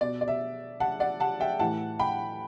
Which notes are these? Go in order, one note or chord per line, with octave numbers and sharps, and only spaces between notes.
B2 D5
D5
E5
F#5 A5
D5 F#5
F#5 A5
E5 G5
A2 E3 F#5 A5
G5 B5